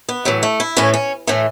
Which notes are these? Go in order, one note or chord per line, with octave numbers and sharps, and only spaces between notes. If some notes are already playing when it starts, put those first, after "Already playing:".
B3
A2 E3 F#3
A3
E4
A2 E3 C#4
C#4
A2 E3 A3